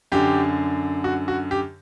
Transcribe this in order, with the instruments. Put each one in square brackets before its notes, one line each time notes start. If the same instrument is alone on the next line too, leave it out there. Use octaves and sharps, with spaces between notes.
[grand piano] F#2 D3 G4
F#4
F#4
G4